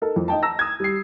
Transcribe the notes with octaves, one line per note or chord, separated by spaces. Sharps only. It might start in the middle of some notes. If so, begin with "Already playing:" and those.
D#4 A4 A#4
F2
D#4 D#5 G5 A5
A5 A#5 E6 A#6
D#6 G#6
G3 C7